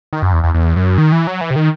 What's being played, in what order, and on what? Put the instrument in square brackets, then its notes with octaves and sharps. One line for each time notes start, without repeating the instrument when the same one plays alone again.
[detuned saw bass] D#3
F#2
E2
E2
E2
F#2
D#3
E3
F#3
E3
C3
D#3